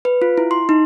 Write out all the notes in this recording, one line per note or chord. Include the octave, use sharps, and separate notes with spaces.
B4
F4
E4
C6
D#4